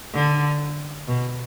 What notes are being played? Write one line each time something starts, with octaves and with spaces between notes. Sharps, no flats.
D3
B2